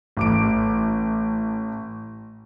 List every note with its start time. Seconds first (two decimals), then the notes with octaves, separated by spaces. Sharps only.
0.17 A1 D6 D7